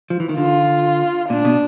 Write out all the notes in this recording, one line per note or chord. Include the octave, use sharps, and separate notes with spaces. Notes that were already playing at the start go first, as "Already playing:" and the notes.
F3
E3
D#3
D3 F4
A#2 D4
B2